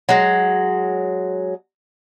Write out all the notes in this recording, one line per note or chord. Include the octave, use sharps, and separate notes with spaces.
F#3 G#3